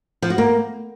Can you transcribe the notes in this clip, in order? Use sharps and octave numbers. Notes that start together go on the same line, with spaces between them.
F3
F#4
A#3